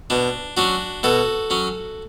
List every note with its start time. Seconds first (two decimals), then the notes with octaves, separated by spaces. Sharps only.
0.10 B2 D4
0.57 F#3 C#4 D4 F#4
1.03 B2 F#4 A4
1.50 F#3 C#4